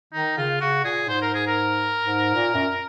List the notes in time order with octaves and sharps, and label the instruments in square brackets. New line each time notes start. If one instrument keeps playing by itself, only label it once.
[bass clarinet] D#3 [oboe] D#4
[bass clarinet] C#3 [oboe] F4
[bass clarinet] C#3 [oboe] F#4
[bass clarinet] A#2 [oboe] G#4
[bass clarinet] G#2 [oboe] C5
[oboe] A#4
G#4
A#4
[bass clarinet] G#2
A#2
F#2